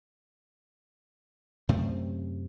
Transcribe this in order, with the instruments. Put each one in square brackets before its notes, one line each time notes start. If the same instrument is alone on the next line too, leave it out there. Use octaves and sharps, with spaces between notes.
[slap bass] F#2 C3 A3 C4